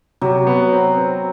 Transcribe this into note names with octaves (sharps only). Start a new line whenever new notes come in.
C3 F#3
B3
C4
C4